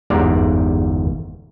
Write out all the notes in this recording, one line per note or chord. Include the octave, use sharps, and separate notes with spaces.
G1 E2 G#2 G3 D5 A#5